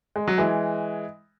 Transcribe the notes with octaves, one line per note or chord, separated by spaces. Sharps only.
G#3
F#3
E3 G#3